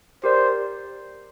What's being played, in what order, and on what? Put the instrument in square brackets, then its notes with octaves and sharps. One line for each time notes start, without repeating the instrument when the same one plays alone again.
[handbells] G4 A#4 D5 [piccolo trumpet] C5